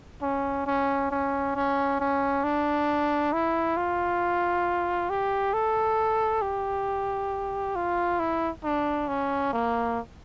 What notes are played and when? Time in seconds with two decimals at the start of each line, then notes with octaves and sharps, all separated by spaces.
0.22 C#4
0.67 C#4
1.11 C#4
1.55 C#4
2.00 C#4
2.44 D4
3.33 E4
3.77 F4
5.10 G4
5.53 A4
6.42 G4
7.76 F4
8.20 E4
8.64 D4
9.08 C#4
9.53 A#3